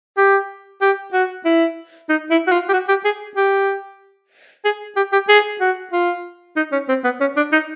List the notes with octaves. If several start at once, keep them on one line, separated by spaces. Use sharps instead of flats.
G4
G4
F#4
E4
D#4
E4
F#4
F4
G4
F#4
G4
G#4
G4
G#4
G4
G4
G#4
F#4
F4
D#4
C#4
C4
B3
C#4
D4
D#4